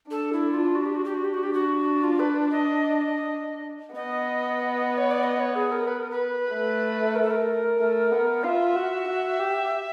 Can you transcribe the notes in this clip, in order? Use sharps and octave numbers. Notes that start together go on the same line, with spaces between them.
D4 A4
E4
F4
F#4
G4
F#4
G4
F#4
G4
F#4
D4 G4
F#4
F4
B4
D#5
B3 D#5
C#5
D5
D#5
C#5
G#4
A#4
B4
A#4
B4
A3
A#4
A4
A#4
A3
B3
F4 E5 F5
F#4
F#4
G4